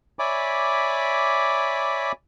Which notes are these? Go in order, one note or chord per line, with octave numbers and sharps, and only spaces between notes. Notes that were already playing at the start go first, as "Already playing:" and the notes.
C#5 D5 E5 G#5 B5 D6